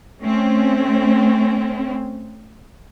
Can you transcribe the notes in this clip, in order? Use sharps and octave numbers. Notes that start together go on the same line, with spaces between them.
A3 C4 C#4